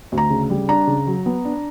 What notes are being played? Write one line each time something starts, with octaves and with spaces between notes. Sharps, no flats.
D2
A#5
C#3
G3
D4 A#5
C#3
F#3
B3
D4